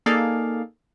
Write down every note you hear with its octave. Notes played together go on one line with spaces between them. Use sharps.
A#3 D#4 G#4 A4 D5 F5